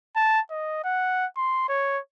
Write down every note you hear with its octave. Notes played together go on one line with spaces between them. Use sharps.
A5
D#5
F#5
C6
C#5